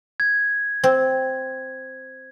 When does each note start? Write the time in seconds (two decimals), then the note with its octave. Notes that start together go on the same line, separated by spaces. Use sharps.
0.20 G#6
0.84 C4